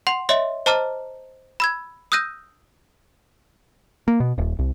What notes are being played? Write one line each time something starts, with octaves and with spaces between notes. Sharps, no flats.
F#5 C6 F7
C#5 D#5 E5 C6
C5 D#5 A5 A#5 D6 F6
B5 E6 G#6
D#6 E6 F#6 G6 A#6 D#7
A#3
B2
D#1
C2